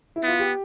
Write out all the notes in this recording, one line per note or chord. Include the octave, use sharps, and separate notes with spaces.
E4
B3 F4
G4